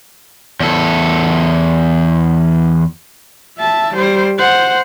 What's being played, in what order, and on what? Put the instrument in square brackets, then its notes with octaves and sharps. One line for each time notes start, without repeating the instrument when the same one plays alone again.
[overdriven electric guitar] E2 A4
[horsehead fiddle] E5 A5
G3 C5
C5 F#5